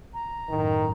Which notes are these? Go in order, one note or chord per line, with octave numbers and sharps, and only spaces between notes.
A#5
F#2 A2 D#3